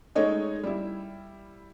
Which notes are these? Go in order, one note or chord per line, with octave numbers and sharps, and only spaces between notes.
G#3 A3 D#4 C#5 D#5
G3 E4